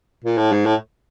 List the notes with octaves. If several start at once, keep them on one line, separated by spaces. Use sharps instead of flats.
A#2
A2
G#2
A2